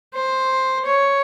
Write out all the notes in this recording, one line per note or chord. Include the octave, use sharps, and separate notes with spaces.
C5
C#5